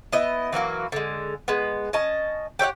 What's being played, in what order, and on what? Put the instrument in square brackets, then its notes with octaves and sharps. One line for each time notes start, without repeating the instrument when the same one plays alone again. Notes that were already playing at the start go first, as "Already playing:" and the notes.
[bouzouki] B3 E4 D#5
E3 F#3 A#3 F#4
D3 G#3
G#3 B3
C#4 D#5 A5
G4 C#5 E5 F#5